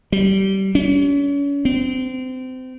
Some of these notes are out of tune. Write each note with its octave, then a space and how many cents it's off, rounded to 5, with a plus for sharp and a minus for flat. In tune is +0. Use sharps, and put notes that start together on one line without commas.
G3 -20
C#4 +35
C4 -30